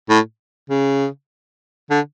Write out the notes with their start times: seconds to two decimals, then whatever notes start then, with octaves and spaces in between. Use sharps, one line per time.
0.09 A2
0.70 C#3
1.90 D3